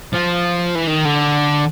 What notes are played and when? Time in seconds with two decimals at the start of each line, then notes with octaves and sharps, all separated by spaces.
0.13 F3
0.75 E3
0.87 D#3
1.05 D3